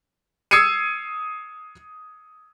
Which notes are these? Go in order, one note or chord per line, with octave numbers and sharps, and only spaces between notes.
D#6 E6 G#6 C7 C#7 D#7